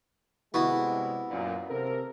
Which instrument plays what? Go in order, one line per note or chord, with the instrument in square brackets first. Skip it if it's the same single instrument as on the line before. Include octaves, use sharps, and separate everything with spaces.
[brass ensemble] C3 G3 G#3 [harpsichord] B3 E4 F#4
[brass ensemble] F#2 A#2
C3 A4 A#4